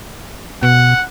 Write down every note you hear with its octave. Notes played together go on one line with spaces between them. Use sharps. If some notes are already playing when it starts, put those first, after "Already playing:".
B2 F#5